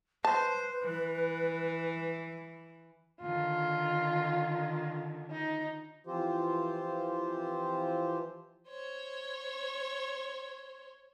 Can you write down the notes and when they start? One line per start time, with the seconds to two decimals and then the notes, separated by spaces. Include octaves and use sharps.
0.25 B4 C5 A5
0.82 E3
3.21 D3 D#3 F4
5.31 D#4
6.07 E3 F3 C4 F4 G4 C5
8.68 C5 C#5